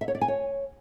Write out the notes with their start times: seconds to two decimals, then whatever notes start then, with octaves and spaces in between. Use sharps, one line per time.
0.01 E5
0.08 C#5
0.15 D5
0.21 G#5
0.28 C#5